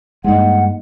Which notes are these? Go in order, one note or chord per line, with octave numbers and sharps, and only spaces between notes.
G2 G#3 A#3 D#4 D#5 F#5